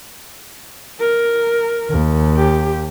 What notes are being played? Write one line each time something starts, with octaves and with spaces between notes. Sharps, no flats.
A#4
D#2
G4